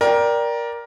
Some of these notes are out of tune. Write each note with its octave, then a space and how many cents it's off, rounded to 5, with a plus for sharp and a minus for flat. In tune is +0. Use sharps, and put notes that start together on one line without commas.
A#4 +15 D5 +0 G5 +0